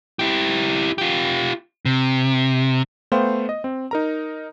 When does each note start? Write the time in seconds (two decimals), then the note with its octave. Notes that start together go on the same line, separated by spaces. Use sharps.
0.19 E4 G4
0.98 F4 G4
1.85 C3
3.12 A3 B3 C5 F5 G5
3.49 D#5
3.64 C4
3.91 D#4 A#4 A#5